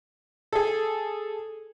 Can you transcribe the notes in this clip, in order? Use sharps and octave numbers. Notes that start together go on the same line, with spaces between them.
G#4 A4